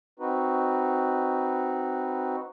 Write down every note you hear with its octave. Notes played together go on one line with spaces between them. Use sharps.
C4 D#4 F#4 B4